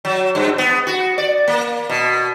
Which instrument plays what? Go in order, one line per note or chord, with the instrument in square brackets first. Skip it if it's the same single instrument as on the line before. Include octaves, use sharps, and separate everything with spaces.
[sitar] F#3
G2
B3
F#4
D5
A#3
B2